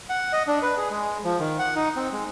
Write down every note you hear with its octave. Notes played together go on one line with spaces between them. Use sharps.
F#5
D#5
D4
B4
G#4
G#3
F3
D#3
F#5
D#4
C4
G#3